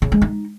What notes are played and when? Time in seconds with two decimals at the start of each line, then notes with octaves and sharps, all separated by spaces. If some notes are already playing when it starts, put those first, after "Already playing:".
0.02 C#3
0.12 G#3
0.22 D#4